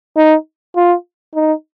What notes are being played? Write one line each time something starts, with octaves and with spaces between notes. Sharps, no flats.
D#4
F4
D#4